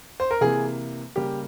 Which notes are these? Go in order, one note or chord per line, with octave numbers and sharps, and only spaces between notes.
C5
A#4
C3 E3 A#3 G#4
C#3 G3 A#3 G4